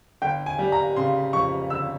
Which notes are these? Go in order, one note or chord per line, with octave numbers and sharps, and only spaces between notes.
G1 G5
G#5
G3
A#5
C#3 C6
F2 C#6
G1 E6